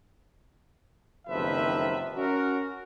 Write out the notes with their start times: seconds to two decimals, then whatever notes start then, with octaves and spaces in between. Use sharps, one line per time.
1.28 F#1 C3 D#3 F3 B4 E5
2.15 C#4 F#4 A#4